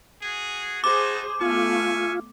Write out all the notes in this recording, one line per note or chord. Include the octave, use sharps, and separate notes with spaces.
F#4 G#4
D#4 F#4 G#4 C5 A5 D6
A3 B3 F4 E5 G#5 C#6